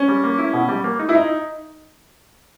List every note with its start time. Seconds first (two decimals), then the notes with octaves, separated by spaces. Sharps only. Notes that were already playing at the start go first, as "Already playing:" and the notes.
Already playing: C#4
0.08 G3
0.24 A#3
0.38 E4
0.54 B2
0.69 G3
0.84 A#3
0.99 D#4
1.09 E4
1.15 D#4